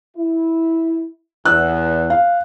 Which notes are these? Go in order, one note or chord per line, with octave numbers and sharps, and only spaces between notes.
E4
E2 E6 F#6
F5